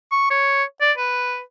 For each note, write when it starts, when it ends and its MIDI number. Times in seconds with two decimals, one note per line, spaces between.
0.12 0.29 85
0.30 0.64 73
0.81 0.92 74
0.98 1.40 71